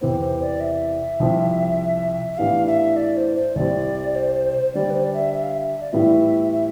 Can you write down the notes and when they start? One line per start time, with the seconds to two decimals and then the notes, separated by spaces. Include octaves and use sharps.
0.01 E2 C3 E3 B3 C5
0.21 C5
0.41 D5
0.60 E5
1.20 C2 C3 F3 C4
2.33 E5
2.38 A2 E3 B3 D4 G4 F5
2.67 E5
2.96 D5
3.17 C5
3.36 C5
3.55 C2 C3 G3 C4 D5
4.15 C5
4.74 D3 G3 D4 D5
4.90 B4
4.94 C5
5.04 D5
5.14 E5
5.34 E5
5.43 F5
5.52 E5
5.82 D5
5.92 A2 E3 G3 B3 F4 E5
6.52 E5